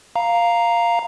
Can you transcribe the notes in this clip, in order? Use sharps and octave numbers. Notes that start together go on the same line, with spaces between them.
F5 A#5